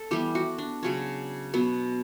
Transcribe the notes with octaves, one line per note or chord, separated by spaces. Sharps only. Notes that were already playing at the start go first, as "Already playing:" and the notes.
Already playing: A4
E3 G3 B3 G4
F#4
D4
C#3 F#3 C#4
B2 F#3 B3